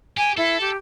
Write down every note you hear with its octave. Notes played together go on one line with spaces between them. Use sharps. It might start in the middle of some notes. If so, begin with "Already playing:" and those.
G4 G#5
E4 A4
G4